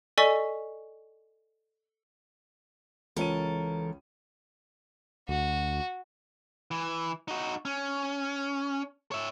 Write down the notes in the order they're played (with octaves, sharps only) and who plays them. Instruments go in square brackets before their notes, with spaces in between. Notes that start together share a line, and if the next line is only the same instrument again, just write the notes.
[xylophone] A4 D5 D#5 G#5 C#6 B6
[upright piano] C#2 C#4 D#7 [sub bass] E3 [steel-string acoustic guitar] A4 A#4
[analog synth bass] D2 [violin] F#4
[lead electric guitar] E3
D#4 F#4
C#4
C#5 E5